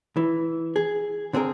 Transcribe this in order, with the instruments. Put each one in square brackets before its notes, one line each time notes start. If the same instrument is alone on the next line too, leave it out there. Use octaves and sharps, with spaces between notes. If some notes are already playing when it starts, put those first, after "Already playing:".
[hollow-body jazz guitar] E3
G#4
D3 C4 G#4 A#4